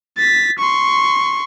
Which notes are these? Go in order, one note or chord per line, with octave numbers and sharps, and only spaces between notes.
A6 B6
C6 C#6